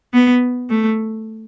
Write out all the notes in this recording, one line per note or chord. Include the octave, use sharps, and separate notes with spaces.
B3
A3